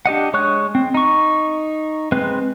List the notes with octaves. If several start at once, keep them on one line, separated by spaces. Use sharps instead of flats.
D4 G4 D#5 F#5
G#3 C#5 C#6 D#6 F#6
C4
D#4 C#6
G#3 C4 B4